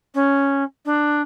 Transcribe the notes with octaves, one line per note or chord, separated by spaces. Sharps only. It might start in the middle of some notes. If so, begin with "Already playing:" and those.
C#4
D4